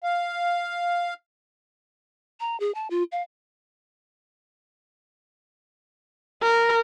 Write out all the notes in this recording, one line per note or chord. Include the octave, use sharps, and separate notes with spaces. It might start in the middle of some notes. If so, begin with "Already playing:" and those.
F5
A#5
G#4
A5
F4
F5
A#4